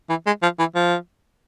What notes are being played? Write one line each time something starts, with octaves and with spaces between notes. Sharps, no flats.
E3
G#3
F3
E3
F3